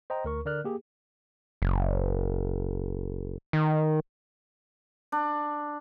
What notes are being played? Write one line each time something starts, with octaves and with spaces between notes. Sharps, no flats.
C5 D#5 G5 A#5
D2 A#4 C#6
D3 A#4 D5 F6 F#6
A#3 G4 G#4
F#1
D#3
D4